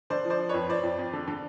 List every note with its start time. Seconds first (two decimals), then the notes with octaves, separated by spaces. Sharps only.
0.10 D3 C5 D5
0.25 F3
0.30 C5 D5
0.40 F3
0.49 F2 B4 C#5
0.69 F2 C5 D5
0.83 F2
0.99 F2
1.13 D3
1.28 D3